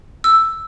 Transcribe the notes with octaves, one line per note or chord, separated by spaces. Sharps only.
E6